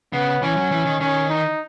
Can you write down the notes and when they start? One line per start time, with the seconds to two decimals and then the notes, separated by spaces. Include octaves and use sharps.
0.13 C#3 B3
0.42 E3 C#4
0.57 F#3
0.71 E3
0.85 D#3
1.00 D#3 C#4
1.29 D#4